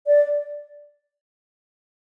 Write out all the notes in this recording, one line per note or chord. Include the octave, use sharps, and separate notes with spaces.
D5